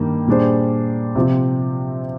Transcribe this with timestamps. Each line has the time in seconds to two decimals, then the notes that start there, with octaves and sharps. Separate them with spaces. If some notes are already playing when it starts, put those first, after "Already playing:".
Already playing: G2 D#3 G3 A#3
0.27 A#2 G3 D4 G#4 C5
1.16 C3 F3 C4 F4